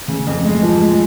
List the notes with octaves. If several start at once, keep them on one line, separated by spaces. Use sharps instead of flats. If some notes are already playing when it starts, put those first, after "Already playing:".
C#3
F2
G#3
F3
G#3